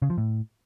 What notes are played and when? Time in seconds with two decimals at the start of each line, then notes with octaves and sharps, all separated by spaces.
0.02 C#3
0.10 F3
0.18 A2